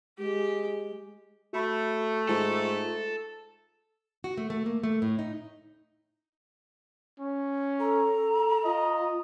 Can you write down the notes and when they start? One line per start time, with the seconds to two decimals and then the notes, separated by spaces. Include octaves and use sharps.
0.19 G#3 G4
1.53 A3 F#4 B5
2.29 G#2 F4 A4
4.24 F#4
4.38 A3
4.50 A3
4.66 A#3
4.84 A3
5.02 A2
5.19 D#4
7.20 C#4
7.80 A4 A#5
8.65 F4 D#5